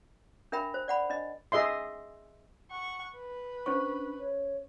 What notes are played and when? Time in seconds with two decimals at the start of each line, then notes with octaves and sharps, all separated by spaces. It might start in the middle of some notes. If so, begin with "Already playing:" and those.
0.52 D4 A#4 E5 G5 B5
0.74 C5
0.88 D5 F#5 B5
1.10 D4 D#5
1.52 G#4 D#5 E5 C6
2.71 F#5 C#6
3.15 B4
3.66 C#4 D4 C5 C#6
4.19 C#5